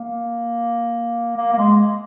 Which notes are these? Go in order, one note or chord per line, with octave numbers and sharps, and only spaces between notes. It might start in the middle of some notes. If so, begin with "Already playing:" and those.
Already playing: A#3
A#3
A#3
G#3